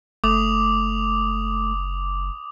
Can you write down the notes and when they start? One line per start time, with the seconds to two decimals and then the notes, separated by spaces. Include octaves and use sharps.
0.24 F#1 A3 D6 D#6 F7